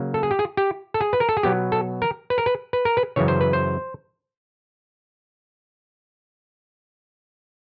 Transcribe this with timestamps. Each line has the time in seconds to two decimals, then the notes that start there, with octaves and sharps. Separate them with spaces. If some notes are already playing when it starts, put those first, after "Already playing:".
Already playing: C#3 F#3 A#3
0.14 A4
0.23 G#4
0.31 G4
0.39 G#4
0.57 G4
0.94 A4
1.01 G#4
1.13 B4
1.20 A#4
1.29 A4
1.37 G#4
1.43 B2 F#3 B3 G4
1.72 A4
2.02 A#4
2.30 B4
2.38 A#4
2.46 B4
2.73 B4
2.85 A#4
2.97 B4
3.16 F#2 C#3 E3 C#5
3.28 C5
3.41 B4
3.53 C5